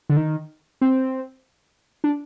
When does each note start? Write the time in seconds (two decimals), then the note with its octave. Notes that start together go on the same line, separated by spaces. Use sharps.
0.09 D3
0.17 D#3
0.81 C4
2.04 D4